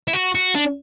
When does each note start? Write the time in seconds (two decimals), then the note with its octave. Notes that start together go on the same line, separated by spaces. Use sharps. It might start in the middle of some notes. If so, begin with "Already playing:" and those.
0.08 E4
0.13 F#4
0.35 F#4
0.55 D4